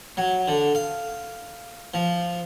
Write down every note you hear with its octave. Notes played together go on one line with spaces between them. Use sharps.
F#3
D3
F5
F3